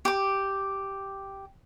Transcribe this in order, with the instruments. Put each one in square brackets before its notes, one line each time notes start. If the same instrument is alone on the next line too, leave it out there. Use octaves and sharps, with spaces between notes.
[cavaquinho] G4 D6